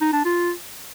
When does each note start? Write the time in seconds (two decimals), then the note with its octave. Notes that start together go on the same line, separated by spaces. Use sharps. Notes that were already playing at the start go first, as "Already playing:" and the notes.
0.01 D#4
0.13 D4
0.25 F4